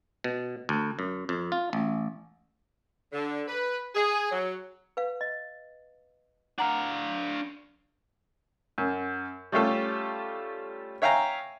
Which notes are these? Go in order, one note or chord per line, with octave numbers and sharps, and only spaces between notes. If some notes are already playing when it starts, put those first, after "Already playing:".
B2
D2
F#2
F2
F4
A1
D3
B4
G#4
F#3
B4 F5
D#5
D4 F5 F#5 A#5
F#2
G3 A3 C#4 F4 G4 A4
C#5 E5 F5 G5 G#5 A#5